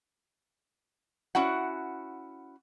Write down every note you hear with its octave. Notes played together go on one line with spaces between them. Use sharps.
C#4 E4 F#4 F#5